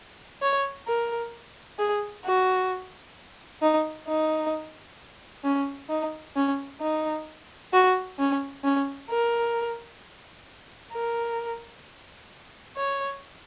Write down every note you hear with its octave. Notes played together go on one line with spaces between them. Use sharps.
C#5
A#4
G#4
F#4
D#4
D#4
C#4
D#4
C#4
D#4
F#4
C#4
C#4
A#4
A#4
C#5